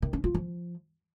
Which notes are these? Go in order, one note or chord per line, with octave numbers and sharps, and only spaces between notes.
D#3
C#4
F4
F3